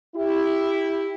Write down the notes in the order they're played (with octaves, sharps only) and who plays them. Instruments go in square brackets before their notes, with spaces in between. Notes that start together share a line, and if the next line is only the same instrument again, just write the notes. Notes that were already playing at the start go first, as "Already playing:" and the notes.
[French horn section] E4 G4